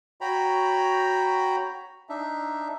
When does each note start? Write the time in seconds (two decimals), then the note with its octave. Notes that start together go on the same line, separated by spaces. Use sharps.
0.21 F#4 C#5 G5 A#5 B5
2.09 D4 D#4 E5